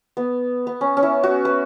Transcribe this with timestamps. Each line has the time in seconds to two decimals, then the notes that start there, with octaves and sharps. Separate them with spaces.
0.17 B3
0.67 B3
0.81 C#4
0.97 C#4
1.03 E4
1.24 F#4
1.45 B4